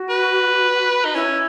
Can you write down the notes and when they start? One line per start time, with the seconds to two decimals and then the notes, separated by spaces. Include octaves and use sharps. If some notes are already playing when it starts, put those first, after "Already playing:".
Already playing: F#4
0.09 B4
1.05 D#4
1.15 C#4 E4